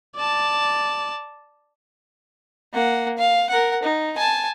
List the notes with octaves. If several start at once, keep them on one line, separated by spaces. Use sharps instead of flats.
D5 A5
A#3 F#5
F5
A#4 F#5
D#4
G#5 A5